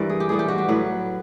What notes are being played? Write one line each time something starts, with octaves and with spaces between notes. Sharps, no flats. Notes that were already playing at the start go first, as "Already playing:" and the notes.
Already playing: G2 E3 G3 A#4
G#4
G4
A2 E3 G3 G#4
G4
F#4
G4
A2 F#3 B4